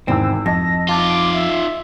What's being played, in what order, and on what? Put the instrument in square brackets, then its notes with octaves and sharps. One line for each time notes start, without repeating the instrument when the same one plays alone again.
[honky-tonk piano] G#1 E2 E6 [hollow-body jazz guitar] C4
[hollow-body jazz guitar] F2 [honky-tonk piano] D#5 A5 [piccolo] A#6
[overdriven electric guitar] D#4 F4 [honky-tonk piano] A5 A6 [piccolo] D6
[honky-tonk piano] D7
[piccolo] E5